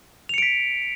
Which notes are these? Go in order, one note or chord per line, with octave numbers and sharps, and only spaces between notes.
B6 C#7 D7 F7